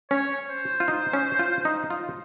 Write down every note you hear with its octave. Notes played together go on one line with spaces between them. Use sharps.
C#4 C#5
C5
F4
D#4
C#4
F4
D#4
F4